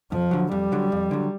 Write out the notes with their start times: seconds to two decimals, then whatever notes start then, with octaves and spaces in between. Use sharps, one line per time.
0.12 F2 F3
0.31 D3 F#3
0.52 F2 G3
0.72 D3 F#3
0.92 F2
1.11 D3 F#3